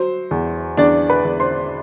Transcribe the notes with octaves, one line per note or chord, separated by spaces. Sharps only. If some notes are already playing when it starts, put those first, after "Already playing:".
Already playing: F#3 C5
E2
E2 D4 D5
B4 B5
E2
C5 C6